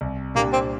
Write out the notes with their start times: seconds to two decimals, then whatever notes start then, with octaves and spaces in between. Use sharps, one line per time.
0.01 C2
0.35 A#2 G3 A#3 D4 G4
0.53 C4